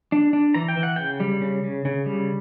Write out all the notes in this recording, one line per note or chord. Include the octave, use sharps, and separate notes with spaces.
D4
D4
E3 A#5
G5
E3
F#5
C#3 G5
G3
C#3
C#3
C#3
G3